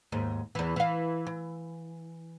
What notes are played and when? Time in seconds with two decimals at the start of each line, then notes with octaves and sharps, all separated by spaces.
0.12 D#2 G#2
0.55 E2 E3
0.76 E3 F5
1.26 E3